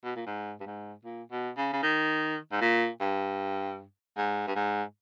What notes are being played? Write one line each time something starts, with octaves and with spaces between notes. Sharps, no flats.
B2
A#2
G#2
G2
G#2
A#2
B2
C#3
C#3
D#3
G#2
A#2
G2
G#2
G2
G#2